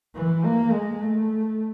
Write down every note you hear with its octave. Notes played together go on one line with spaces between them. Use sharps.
E3
A#3
G#3
A3